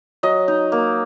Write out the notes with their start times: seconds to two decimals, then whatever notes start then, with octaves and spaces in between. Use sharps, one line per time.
0.23 F#3 D#5
0.48 D#4
0.72 A#3